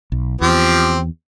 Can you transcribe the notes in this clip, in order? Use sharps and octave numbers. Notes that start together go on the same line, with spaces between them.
B1
E2 F3 C4 G4